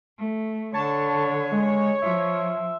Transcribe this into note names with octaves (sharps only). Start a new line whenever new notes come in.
A3
D3 C#5 A5
G#3
F3 E5